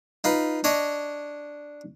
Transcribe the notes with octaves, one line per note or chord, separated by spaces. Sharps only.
D#4 F4 B4
D4 C#5 D#5